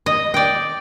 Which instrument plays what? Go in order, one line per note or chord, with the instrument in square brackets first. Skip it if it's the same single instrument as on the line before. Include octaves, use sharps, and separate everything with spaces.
[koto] D#5
D5 G5